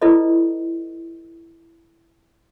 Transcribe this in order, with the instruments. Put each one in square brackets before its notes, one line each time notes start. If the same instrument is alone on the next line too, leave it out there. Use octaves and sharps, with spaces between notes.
[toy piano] E4 F4 A4 B4 D5 D#5